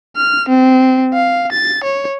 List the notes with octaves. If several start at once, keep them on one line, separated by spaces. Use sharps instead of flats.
F6
C4
F5
A6
C#5